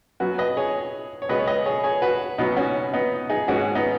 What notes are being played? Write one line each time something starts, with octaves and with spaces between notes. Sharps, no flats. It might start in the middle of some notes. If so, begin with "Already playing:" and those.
F#2 F#3 B3 F#4 B4
B4 D#5
G#4 C#5
C#5
C#2 B2 G#3 B3 B4 D#5
C#5
B4 D#5
G#4 C#5
G#4 C#5
F#4 B4
C#2 B2 F#3 B3 D#4
C#4 F#4
B3 D#4
D#4 G#4
G#1 G#2 G#3 C#4 F#4
B3 D#4